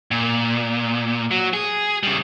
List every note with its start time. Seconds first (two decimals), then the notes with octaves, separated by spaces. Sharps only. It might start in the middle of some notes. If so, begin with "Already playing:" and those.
0.11 A#2
1.31 F#3
1.53 G#4
2.03 C#3 G3